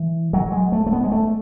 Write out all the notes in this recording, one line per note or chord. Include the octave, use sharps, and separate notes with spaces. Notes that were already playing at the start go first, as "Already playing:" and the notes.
Already playing: E3
F#3
G#3
A3
A3
B3
G#3
A3